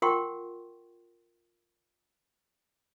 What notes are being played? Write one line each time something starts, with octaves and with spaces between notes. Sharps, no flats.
F4 A#4 F#5 G5 C6 C#6